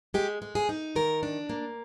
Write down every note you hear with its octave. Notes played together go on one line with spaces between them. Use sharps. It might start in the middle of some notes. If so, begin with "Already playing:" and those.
G#3 G4
G#3
G#4
D#4
D#3 A#4
D4
A#3